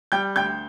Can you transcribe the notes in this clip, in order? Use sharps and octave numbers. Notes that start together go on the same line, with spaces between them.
G3 G5 G6
D2 G5 G6